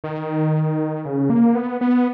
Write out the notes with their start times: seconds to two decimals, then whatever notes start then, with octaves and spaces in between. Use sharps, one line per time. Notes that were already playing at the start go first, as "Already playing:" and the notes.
0.04 D#3
1.05 C#3
1.30 A#3
1.55 B3
1.81 B3